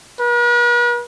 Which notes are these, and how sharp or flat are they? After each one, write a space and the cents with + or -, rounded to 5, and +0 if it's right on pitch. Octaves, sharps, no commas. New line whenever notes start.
B4 -45